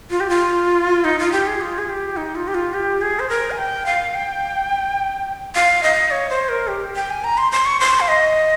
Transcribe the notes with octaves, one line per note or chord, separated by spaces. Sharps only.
F4
G4
F4
D#4
F4
G4
G#4
F4
G#4
G4
D#4
F4
G4
F4
G4
G#4
C5
A#4
G#5
G5
F5
G5
F5
D#5
C#5
C5
A#4
G4
G5
G#5
A#5
C6
C6
C#6
C6
F5
D#5